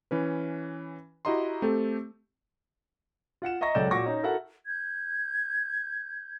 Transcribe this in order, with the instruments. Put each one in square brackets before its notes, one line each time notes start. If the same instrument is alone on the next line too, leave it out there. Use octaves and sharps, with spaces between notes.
[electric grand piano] E3 C#4 B4
E4 F#4 G4 D#5 A#5 C6
A3 C4 G4 A4
[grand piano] F4 F#5 C#7 E7
D#5 E5 A#5 C#6 A#6
C#2 F#2 A4 D5 G6 E7
A#2 F#4 C#6 D6 A#6
C#4 D#4
E4 F#4 A4 A#4 E5 F#5
[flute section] G6 G#6